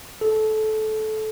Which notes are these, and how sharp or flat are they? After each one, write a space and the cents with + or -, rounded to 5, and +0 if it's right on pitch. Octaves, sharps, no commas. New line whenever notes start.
A4 -20